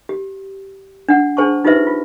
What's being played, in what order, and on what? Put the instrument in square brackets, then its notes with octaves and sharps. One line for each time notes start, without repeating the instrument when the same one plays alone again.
[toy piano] G4
D4 F#5
D4 G#4 C5 A5 C#6
D#4 F4 G4 B4 C5 E5
F4